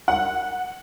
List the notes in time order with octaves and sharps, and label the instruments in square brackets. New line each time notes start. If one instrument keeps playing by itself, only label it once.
[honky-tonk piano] F#5